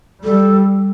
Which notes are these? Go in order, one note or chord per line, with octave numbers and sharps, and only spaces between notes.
G3 A4